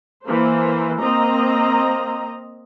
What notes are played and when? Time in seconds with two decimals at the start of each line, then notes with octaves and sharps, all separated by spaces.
0.25 E3 A#3 C5
1.00 A#3 C4 D#5 A#5